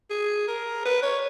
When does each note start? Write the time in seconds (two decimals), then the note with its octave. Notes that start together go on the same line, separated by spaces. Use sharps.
0.10 G#4
0.48 A#4
0.85 B4
1.03 C#5